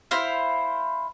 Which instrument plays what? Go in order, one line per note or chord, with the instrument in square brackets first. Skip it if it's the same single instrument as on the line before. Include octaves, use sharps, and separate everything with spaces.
[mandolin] E4 C5 F5